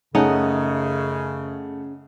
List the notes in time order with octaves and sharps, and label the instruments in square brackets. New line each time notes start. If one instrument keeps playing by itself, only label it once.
[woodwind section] F#2 C#3 [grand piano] A3 F#5 [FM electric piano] C#4 G#4 [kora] D#4